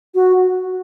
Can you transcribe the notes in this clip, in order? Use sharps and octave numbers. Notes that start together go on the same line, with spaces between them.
F#4